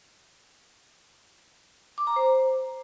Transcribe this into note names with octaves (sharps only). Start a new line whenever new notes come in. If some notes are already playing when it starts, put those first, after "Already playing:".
D6
A#5
C5